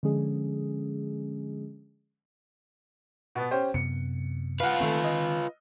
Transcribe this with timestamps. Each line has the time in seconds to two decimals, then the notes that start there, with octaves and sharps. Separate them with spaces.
0.03 D3 F3 G#3 C#4 G#4
3.35 B2 B3
3.51 C#4 G4 C5
3.74 F#2 C3 B3 C#7
4.60 F4 B4 F5 F#5
4.80 D#3 A3 C4 A4
5.04 D#5